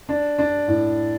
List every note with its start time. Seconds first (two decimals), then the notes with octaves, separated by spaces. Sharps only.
0.09 D4
0.38 D4
0.68 A2